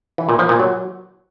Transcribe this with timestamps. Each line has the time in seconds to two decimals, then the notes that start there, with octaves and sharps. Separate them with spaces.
0.18 E3
0.29 A#2
0.39 F3
0.49 A#2
0.59 F#3